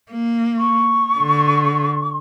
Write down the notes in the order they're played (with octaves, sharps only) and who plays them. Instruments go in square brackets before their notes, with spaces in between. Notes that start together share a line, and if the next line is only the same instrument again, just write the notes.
[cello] A#3
[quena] C#6
[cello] D3